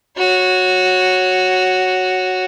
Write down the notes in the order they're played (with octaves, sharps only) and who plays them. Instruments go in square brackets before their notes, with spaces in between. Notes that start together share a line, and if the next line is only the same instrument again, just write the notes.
[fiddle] F#4 C#5